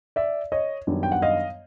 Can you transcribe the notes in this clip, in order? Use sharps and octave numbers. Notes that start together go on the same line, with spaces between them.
D5 E5
C#5 D#5
F#2 D#3 G3 B3 D4
G5
F#5
D#5 F5